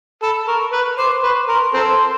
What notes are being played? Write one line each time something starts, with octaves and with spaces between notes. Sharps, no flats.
A4 B5
A#4 C#6
B4
C5 D6
C6
B4 C#6
A#4 C6
C4 A4